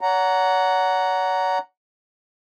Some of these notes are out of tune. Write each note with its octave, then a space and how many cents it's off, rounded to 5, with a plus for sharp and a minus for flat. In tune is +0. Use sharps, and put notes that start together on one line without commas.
C#5 +40 F#5 +0 A#5 +0